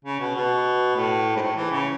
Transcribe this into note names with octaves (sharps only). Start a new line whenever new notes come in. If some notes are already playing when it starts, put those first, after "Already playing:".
C#3
B2
B2
A2
G#2
A2
E3
C#3